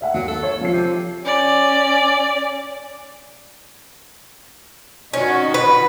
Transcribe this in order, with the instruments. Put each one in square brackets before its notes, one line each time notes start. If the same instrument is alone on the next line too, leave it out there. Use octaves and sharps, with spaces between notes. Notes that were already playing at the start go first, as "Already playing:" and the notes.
[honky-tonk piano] D5 E5 F#5
[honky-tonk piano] D#2 [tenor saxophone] F#3
[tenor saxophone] A4
[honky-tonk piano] C#5
F3 C7
[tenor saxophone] C3
[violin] C#4 D5
[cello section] D#3 F#4 [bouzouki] C#4
[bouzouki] B4